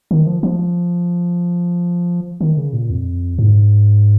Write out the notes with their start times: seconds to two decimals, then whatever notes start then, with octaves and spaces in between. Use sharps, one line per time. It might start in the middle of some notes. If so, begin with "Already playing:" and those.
0.11 D#3
0.27 F3
0.43 F3
2.41 D#3
2.57 C#3
2.73 A#2
2.90 F2
3.38 G#2